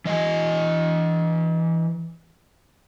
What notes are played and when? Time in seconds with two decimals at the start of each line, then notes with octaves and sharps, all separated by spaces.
0.05 E3 D#5 F#5 G#5